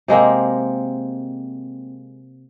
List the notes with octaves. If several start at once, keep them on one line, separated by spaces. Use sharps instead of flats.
C3 G#3 A#3 C4